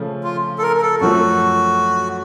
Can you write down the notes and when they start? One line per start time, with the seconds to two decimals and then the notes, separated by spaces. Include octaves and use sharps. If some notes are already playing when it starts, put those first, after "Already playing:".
Already playing: C#3 F3 A3
0.23 F4
0.58 A4
0.63 A#4
0.77 A#4
0.82 A4
1.01 F#2 F3 A3 F#4